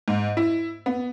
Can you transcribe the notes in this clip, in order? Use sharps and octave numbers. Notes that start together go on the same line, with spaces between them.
G#2
E4
B3